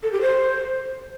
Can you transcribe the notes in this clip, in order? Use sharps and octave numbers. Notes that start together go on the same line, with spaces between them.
A4
G4
C5